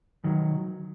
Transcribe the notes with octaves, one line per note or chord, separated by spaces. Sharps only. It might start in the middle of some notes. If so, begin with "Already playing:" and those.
D#3 F#3